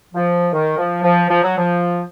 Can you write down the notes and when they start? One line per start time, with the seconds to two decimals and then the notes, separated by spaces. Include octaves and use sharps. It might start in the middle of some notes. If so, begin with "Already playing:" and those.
0.14 F3
0.52 D#3
0.78 F3
1.03 F3
1.29 F3
1.43 F#3
1.57 F3